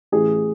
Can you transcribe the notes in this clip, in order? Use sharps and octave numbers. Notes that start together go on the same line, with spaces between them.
A1 G#4